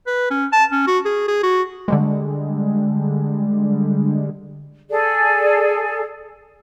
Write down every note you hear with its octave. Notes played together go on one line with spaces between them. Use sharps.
B4
C#4
A5
C#4
F#4
G#4
G#4
F#4
D3 G3 G#3
G#4 A4 D5